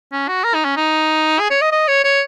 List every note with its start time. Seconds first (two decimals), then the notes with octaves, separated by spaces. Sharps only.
0.12 C#4
0.28 F#4
0.44 A#4
0.55 D#4
0.65 C#4
0.77 D#4
1.40 G#4
1.51 C#5
1.62 D#5
1.72 D#5
1.88 C#5
2.04 C#5